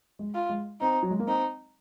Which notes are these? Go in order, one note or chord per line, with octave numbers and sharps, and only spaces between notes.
G#3
F4
G#3
C4 D#4
F#3
G#3
A#3
C4 D#4